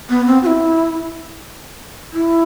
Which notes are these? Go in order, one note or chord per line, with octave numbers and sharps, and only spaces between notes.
B3
C4
F#4
E4
E4